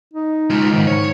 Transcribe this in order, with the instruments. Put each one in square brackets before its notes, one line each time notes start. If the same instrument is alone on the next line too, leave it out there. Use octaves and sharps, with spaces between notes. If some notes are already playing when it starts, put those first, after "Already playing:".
[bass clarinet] D#4
[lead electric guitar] G#3 F4
[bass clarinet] G#2 [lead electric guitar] D#3
[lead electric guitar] C#5